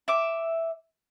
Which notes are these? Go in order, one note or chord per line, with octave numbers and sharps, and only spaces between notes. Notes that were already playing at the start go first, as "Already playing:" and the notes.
E5 D6